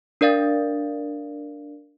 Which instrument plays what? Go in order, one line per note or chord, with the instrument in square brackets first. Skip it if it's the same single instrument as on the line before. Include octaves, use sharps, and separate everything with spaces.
[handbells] D4 A#4 D5 F5 A6